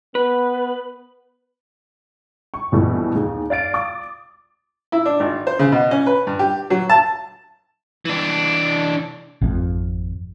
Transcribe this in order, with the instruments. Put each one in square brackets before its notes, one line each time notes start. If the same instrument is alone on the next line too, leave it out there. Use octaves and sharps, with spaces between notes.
[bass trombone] B3 [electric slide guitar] B4
[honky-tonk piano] C#6
A#1 B2 E3 G3 A3
D#2 G#4
D5 F5 A6 D7
D6 D#6
[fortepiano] E4
D4
G#1
C5
C#3
B2
C#4
B4
G2
G4
F#3
A5
[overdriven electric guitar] E3 D4
[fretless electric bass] G#1 F2